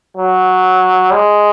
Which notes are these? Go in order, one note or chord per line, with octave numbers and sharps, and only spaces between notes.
F#3
G#3